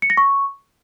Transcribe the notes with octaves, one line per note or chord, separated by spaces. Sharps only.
C#7
A#6
C#6